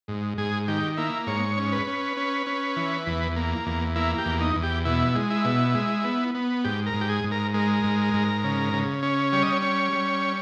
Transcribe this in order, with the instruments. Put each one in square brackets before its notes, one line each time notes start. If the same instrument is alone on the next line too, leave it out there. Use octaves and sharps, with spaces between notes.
[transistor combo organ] G#2
G#2 G#4
D#3 G4
A#3 E4
G#2 C#5
C#4
B4
C#4
C#4
C#4
E3
E2
A#3
E2
A#3 E4
G4
E2
D#4
E2
G4
B2 E4
G#3
E4
B2
G#3
B3
B3
G#2 G4
A#4
G#2
G4
G#4
G#2
A#4
G#3 A#4
G#2
G#2
C#3
C#3
C#4
G3 C#5
D#5
C#5
C#4
G3